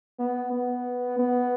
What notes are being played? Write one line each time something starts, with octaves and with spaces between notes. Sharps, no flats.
B3
B3
B3